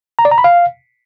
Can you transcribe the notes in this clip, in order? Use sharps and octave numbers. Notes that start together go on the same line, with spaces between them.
A#5
D5
A#5
B5
F5